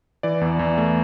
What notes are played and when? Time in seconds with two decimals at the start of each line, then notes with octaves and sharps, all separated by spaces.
0.23 E3 D5
0.41 E2
0.59 E2
0.78 A3